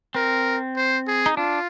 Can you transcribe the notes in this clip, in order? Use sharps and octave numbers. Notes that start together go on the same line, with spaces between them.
C4 A#4
C5
G#4
D#4
D4 F4